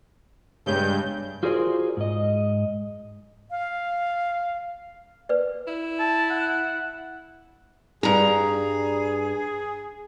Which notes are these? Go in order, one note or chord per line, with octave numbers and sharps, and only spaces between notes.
G2 C#3 G#3 B3 G6
F4 F#4 G#4 A#4 C5 D5
G#2 D#5
F5
B4 D5
E4
A5
F#5
G2 G#4 A#5